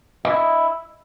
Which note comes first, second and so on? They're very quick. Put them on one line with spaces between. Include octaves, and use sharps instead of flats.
D#5 E5 E4